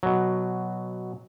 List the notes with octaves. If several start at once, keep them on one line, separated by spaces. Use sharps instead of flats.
B2 F#3